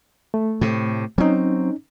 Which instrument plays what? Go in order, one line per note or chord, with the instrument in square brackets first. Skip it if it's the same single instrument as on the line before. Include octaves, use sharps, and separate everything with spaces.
[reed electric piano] A3
[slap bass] A2 C3
[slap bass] F#3 C4 [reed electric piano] C#4 D#4